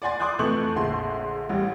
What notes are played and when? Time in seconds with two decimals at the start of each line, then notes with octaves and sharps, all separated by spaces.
0.02 D5 F#5 G#5 C6 A6
0.19 C6 D6 D#6 F#6 G6
0.39 F2 E3 A3 C#6 G6 F#7
0.76 A#1 D3 G#4 C6
1.49 A1 G3